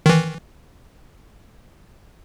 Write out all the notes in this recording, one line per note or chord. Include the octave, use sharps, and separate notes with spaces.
D#3 E3